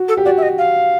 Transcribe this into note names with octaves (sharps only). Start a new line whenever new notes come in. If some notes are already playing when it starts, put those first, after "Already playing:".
Already playing: F#4
A4
G4
F#4 D5
E5
D#5
F5